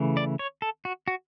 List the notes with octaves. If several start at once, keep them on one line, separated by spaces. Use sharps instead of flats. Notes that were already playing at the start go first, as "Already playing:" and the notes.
Already playing: C#3 E3 A3
D5
C#5
A4
F#4
F#4